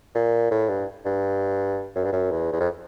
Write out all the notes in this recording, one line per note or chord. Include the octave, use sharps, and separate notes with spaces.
A#2
A2
G2
G2
F#2
G2
F#2
E2
E2
F2